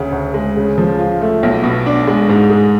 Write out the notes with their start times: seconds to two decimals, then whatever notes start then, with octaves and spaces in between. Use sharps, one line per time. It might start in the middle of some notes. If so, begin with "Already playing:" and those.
Already playing: D2 C#3
0.12 D2
0.34 G#3
0.56 C#3
0.78 F3
0.99 F4
1.21 A3
1.43 B1
1.63 B2
1.86 D4
2.07 G#3
2.29 G#2
2.50 G#3